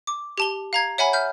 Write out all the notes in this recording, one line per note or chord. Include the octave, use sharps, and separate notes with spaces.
D6
G4 A5 G7
F5 A#5 G#6
C#5 E5 F#5 G#5 B5
E5 F6 G6